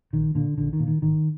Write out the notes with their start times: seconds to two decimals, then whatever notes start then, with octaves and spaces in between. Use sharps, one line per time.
0.13 A#1 D#3
0.35 A#2 D3
0.58 A#1 D3
0.73 D#3
0.80 A#2
0.87 D#3
1.02 G#1 D#3